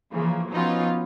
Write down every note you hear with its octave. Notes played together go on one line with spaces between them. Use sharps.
C#3 E3 F3 A#3
F3 F#3 B3 C#4 D#4 F4